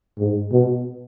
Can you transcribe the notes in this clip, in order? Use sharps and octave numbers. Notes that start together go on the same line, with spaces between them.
G#2
B2